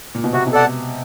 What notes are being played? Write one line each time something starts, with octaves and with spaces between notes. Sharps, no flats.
A#2
B2
C3 F#4
B2
A4 D5 F#5 A5